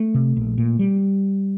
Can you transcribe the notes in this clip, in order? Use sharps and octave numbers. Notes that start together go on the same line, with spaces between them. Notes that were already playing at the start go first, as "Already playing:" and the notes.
Already playing: A3
C3
A#1
A#2
G3